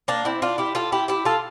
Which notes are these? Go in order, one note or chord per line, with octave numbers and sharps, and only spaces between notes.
A#3 D4
C4 E4
D4 F4
E4 G4
F4 A4
E4 G4
E4 G4
F4 A4